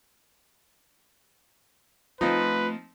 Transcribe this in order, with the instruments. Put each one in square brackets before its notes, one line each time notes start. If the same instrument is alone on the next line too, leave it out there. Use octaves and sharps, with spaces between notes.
[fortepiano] F3 C4 D#4 [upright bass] A3 [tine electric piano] F4 [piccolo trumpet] B4